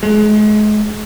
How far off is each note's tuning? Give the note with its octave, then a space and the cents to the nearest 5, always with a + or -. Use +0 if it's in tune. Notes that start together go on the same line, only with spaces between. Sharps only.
G#3 +35